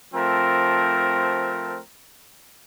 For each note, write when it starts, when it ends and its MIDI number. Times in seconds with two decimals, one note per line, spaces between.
0.14 1.78 53
0.14 1.78 57
0.14 1.78 60
0.14 1.78 70